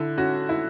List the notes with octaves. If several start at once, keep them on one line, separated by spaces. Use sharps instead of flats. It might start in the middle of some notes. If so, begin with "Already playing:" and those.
Already playing: D3 E4
C#4 F#4
E4